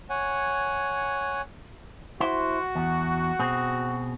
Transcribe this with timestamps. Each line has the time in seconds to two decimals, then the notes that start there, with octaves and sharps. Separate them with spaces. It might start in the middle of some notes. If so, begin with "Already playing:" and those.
0.10 C#5 F#5 G#5
2.20 E4 F#4 C5
2.76 E2
3.39 B2 C4 G#4